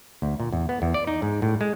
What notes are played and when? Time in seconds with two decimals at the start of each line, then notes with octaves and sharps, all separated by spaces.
0.22 D2
0.40 A#2
0.52 E2
0.69 B3
0.82 E2
0.94 D5
1.07 D#4
1.22 G#2
1.42 A2
1.61 G#3